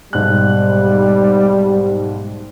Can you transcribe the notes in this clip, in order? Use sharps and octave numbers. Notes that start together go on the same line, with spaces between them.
B1 G#2 G3 F#6